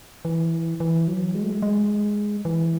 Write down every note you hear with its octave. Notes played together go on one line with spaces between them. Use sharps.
E3
E3
F#3
G#3
A3
G#3
G#3
E3